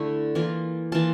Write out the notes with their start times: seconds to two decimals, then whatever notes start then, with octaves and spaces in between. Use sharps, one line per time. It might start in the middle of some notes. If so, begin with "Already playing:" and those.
Already playing: D3 A3 E4
0.35 E3 A#3 F4
0.92 E3 A#3 F4 A5